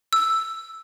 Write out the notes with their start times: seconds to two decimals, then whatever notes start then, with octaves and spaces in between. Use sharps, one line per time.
0.13 E6